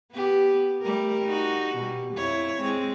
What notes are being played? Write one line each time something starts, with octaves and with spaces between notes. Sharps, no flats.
B3 G4
G3 A3 A#4
D#4 F#4
B2 G3
F2 E4 C#5
G#3 C4